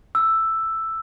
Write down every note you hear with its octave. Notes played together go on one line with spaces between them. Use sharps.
E6